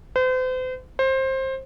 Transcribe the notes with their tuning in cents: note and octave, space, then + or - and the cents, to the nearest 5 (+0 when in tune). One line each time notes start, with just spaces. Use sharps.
C5 -40
C5 +20